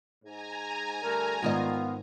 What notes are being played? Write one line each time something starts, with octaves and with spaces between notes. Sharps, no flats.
G#2 G#5 A#5
D3 G3 A3 A#4
G#2 D#3 B3 F4 D#5